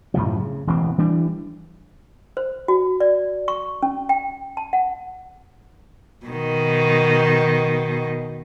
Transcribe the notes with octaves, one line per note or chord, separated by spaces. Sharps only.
F#2 A2 C3 F3
C#3
E1 A1 E3 C4
E3 G3 D4
C5
F#4
D5
C#6
C#4
G5
A5
F#5
B2 D#3